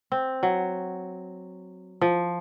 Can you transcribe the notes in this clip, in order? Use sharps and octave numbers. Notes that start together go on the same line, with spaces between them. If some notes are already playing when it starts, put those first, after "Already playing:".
C4
F#3
F3